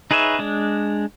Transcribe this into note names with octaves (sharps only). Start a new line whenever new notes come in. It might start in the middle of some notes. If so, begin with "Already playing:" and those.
D#4 G#4 B4 C#5 E5
G#3 D4